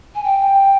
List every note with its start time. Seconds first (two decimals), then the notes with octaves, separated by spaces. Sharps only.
0.15 G#5
0.24 G5